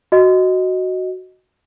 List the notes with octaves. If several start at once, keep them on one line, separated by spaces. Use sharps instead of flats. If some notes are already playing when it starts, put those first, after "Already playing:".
F#4 D#5